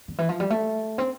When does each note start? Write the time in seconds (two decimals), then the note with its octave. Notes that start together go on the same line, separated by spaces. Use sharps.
0.08 D3
0.18 E3
0.29 F3
0.40 G3
0.50 A3
0.98 C4